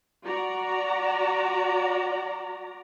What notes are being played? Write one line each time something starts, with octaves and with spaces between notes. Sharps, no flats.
F#4 D5 A#5